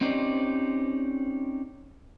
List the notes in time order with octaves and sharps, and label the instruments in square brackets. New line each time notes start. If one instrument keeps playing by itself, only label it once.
[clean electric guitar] C4 C#4 D#4 G4 C5 D5